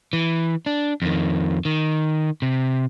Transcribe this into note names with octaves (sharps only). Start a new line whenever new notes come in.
E3
D4
F2 D#3
D#3
C3